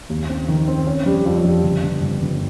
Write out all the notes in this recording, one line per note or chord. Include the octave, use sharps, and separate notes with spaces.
D#2
C4
D#3
C4
C#4
G3
F2
G3
G1
G1
G1
G1